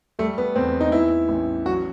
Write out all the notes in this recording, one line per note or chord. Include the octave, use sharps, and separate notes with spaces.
G3 A3
B3
E2 C4
D#4
E3 E4
A1
F#3 F#4